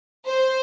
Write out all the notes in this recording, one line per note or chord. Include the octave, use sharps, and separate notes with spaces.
C5